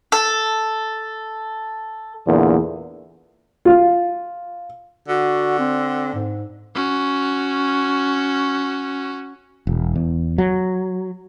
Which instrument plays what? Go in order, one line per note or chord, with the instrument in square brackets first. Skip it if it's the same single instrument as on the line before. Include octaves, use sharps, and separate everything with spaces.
[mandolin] A4
[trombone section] E2 A#2 D3
[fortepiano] F4
[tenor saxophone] D3 [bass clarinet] F#4
[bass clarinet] C4
G#2
[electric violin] C#4 F#4
[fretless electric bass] E1
E2
F#3